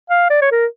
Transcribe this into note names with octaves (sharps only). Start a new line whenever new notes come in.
F5
D5
C#5
A#4